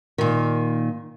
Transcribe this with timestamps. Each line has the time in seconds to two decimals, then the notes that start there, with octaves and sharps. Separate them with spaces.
0.18 A#2 D#3